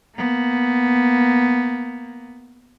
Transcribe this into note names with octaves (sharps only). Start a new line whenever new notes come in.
A#3 B3